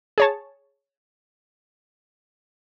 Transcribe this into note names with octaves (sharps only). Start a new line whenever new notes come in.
G#4 C#5 A5